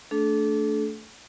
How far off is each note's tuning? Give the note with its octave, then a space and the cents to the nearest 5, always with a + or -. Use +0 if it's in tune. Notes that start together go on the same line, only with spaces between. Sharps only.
A3 +10 D4 -15 A4 -35